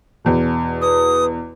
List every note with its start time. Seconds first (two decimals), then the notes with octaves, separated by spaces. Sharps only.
0.24 E2 B2
0.82 B4 D#6